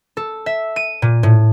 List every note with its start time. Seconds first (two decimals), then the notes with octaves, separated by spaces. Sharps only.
0.17 A4
0.46 E5
0.76 D#7
1.02 A#2
1.23 A2